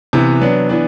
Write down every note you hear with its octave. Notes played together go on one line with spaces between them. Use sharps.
C3 E3 B3
F#3 B3 D4
E3 B3 D4